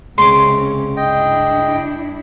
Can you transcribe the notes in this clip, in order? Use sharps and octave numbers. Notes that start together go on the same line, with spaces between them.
C#2 C3 C#4 C#5 C6 D6
G2 D4 E4 D#5 G5